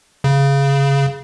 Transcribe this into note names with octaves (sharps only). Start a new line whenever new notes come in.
C#3